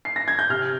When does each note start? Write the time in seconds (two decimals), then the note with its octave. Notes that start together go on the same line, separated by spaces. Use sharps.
0.05 C7
0.16 A#6
0.28 G#6
0.39 G6
0.49 C3 F6